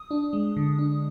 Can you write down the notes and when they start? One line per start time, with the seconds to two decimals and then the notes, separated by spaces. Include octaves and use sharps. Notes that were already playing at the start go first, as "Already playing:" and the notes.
Already playing: D#6
0.11 D4
0.33 G#3
0.57 D3
0.79 D4